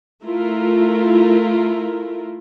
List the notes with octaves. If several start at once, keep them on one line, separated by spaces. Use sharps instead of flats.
A3 E4 F4 A#4